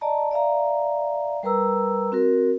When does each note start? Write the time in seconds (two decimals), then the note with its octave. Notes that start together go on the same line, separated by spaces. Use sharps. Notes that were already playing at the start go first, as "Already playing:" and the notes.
0.01 D5 D#5 A5 A#5
0.31 D5 E5 F5 A#5
1.43 G3 A#4 B4 A#5 E6
2.12 C4 F#4 A#4